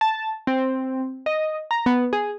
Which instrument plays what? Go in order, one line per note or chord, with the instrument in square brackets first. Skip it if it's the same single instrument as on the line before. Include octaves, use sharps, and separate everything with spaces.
[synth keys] A5
C4
D#5
A#5
B3
G#4